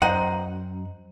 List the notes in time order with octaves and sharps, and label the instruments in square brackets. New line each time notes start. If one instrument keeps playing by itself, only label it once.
[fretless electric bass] F#2 [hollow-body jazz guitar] C5 D#5 F#5 [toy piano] A#5